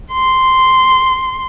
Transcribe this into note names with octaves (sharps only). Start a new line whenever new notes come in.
C6